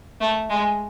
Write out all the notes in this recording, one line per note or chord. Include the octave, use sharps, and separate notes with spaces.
A3
G#3